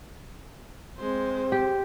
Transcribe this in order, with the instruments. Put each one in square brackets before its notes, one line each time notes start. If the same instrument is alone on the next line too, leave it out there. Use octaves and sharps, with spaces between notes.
[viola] G#3 C5 [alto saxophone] C4
[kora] G4